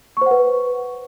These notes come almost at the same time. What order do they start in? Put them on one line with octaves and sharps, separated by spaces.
C#6 C5 F#5 B4